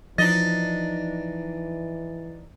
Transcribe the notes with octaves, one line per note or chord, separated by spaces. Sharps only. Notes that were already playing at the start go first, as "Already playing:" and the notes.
E3 F3 D4 D#4 D#5 A6